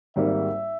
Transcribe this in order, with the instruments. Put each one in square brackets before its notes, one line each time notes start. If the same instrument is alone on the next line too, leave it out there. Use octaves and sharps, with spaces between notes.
[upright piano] G#1 G#2 G3 A#3 [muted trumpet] E5